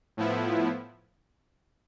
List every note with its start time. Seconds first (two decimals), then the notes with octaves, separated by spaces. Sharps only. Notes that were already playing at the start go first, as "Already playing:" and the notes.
0.17 A2 F3 B3 E4